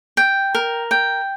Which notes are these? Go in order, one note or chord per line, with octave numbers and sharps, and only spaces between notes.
G5
A#4
G5